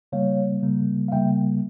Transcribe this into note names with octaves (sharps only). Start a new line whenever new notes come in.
C#3 G3 A#3 C#5 F5
C#3 G3 A#3
F5
C#3 G3 A#3 E5 G5